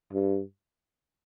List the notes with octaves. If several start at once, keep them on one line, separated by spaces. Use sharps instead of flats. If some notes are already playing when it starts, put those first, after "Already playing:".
G2